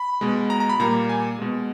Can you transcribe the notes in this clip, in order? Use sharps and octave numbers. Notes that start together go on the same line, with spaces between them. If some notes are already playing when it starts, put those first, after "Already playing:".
Already playing: B5
B2 G#3
A#5
A#5
B5
A#2 G3 A#3 A#5
G#5
B2 G#3